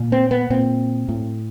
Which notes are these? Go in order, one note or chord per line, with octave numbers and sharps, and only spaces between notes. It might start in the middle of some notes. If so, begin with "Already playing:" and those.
Already playing: A#2
C4
B3
A#2 C4
A2